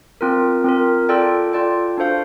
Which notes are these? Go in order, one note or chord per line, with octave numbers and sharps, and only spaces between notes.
C4 F4 A#4
C4 F4 A#4
F4 A4 D5 G5
F4 A4 D5 G5
D4 F#4 A4 C5 F5